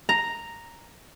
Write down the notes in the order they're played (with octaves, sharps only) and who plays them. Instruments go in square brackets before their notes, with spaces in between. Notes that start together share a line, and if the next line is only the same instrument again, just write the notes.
[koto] A#5